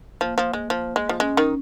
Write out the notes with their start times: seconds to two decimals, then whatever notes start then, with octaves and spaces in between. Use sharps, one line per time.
0.21 F3 A#3
0.38 F3
0.53 G#3
0.70 F3
0.96 G#3
1.09 F3
1.20 G#3 C#4
1.37 D#3 D#4